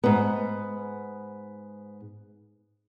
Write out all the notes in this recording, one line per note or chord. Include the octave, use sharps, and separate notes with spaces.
G#2 B3